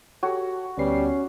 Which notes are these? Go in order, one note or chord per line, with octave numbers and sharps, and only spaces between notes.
F#4 G4 A4 C#5
D2 G3 B3 C#4 C7